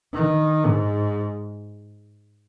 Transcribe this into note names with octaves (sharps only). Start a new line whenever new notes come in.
D#3
G#2